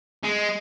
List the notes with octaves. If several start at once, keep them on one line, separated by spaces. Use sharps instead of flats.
G#3